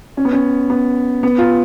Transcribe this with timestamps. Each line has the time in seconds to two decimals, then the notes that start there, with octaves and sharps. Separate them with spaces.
0.17 C#4
0.25 B3
0.33 C#4
0.70 B3
1.23 B3
1.38 F4